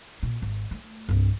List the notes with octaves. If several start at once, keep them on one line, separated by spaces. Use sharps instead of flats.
A#2
G#1
A3
C2 G2